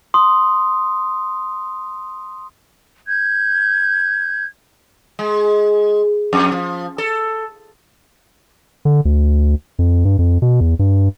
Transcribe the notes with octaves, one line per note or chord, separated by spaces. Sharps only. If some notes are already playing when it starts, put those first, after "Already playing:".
C6 D#6
G6 G#6
G#3
F2
F3
A4
D3
D2
F2
G2
F2
B2
E2
G2